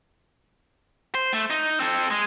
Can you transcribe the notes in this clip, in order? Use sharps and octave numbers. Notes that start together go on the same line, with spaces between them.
C5
A3
D#4
C4 A4
G#3